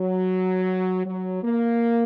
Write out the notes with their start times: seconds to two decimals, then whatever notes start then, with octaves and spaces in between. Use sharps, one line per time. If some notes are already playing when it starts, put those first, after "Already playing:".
Already playing: F#3
1.05 F#3
1.43 A#3